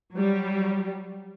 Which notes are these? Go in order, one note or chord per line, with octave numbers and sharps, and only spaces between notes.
F#3 G3